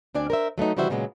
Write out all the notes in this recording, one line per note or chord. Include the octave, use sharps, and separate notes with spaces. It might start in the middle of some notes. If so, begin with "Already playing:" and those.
D2 C4 D4 D5 G#5
A#4 C5 E5
F#3 A3 B3 D#4
C#3 E3 G3 F#4 C5 E5
A#2 C#3 F#3 G#3 B3